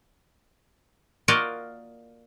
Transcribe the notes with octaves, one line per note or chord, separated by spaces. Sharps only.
A#3 F4 F#4 A#4 D5 D#5